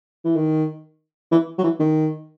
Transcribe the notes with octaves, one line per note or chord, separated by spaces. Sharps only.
E3
D#3
E3
F#3
E3
D#3